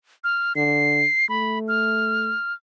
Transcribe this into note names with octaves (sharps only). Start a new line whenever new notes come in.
F6
D3 C7
A3 B5
F6